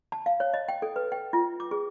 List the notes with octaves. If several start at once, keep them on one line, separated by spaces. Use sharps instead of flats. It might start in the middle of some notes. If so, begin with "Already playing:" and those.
A5
F5
C#5
D#5
G5
A4
B4
G5
F4
D6
G#4